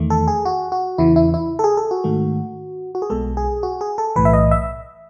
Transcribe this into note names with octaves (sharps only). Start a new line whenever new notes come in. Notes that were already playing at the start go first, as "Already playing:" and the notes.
Already playing: E2 D#3 A3
A4
G#4
F#4
F#4
E2 C#3 E3 E4
E4
E4
A4
G#4
A4
F#4
G#2 D#3 A3
F#4
G#4
B1 B2 G#3 A4
G#4
F#4
G#4
A4
B1 A2 E3 B4
E5
D#5
E5